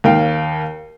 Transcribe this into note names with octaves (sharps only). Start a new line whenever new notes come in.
D#2 F5 G5